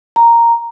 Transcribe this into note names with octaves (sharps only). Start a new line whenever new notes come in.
A#5